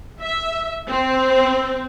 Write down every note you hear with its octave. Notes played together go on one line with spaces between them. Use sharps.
E5
C4